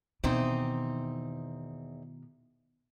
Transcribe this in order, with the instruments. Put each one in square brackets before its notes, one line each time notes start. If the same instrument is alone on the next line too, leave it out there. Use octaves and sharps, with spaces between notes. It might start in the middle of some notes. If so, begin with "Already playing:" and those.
[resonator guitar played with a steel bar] E2 C4 D#4 [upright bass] B2 D#3